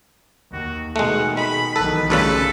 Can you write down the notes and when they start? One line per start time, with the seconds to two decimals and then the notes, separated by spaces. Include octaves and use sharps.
0.53 D#2 F#4
0.96 B2 D#3 G#3 A3 F#5
1.37 G#3 B5
1.76 B1 D#3 E3 A4 B4 B5
2.10 D2 G2 C#3 A4 B4